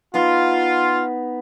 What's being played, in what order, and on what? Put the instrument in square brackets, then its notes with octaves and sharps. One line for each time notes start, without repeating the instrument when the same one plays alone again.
[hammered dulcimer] B3 D#4 B4 [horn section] F4